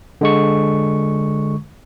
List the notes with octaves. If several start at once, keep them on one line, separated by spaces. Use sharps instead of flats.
D3 G#3 C#6